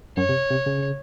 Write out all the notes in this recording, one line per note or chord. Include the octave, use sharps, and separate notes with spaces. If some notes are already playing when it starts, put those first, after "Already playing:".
F#2 C#5
C3
C3
C#3